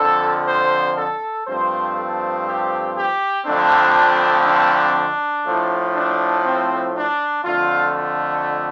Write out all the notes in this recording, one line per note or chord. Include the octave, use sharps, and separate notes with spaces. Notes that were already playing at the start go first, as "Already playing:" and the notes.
Already playing: F2 D3 F3 A4
C5
A4
G2 F3 A3 C4 C5
A4
G4
G4
F2 D3 F3 A3 C4 D4
D4
A2 F3 A3
D4
C4
D4
F2 D3 A3 F4
F4